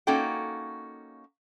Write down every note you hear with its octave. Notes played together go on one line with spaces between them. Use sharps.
A#3 C#4 D#4 F#4 A4 G5